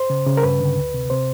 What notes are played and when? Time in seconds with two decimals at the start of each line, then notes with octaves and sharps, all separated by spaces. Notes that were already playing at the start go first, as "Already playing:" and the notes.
Already playing: C5
0.10 C#3
0.26 C#3
0.37 A#4
0.43 G2 B4
0.60 D3
0.76 D2
0.94 C3
1.10 C3 C5